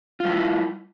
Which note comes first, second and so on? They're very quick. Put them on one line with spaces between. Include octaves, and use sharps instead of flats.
F4 G3 E4